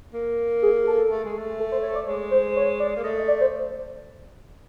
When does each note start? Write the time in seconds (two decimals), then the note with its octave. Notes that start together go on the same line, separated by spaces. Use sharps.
0.14 A#3
0.62 G#4
0.87 A4
1.10 A3
1.25 G#3
1.38 A3
1.60 A4
1.72 C5
1.83 C#5
1.95 D5
2.07 G#3 C#5
2.31 C5
2.56 C#5
2.80 D5
2.97 A#3
3.03 A3 D#5
3.16 D#5
3.28 D5
3.41 C5